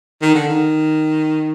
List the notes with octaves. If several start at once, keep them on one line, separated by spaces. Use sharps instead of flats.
D#3
D3
D#3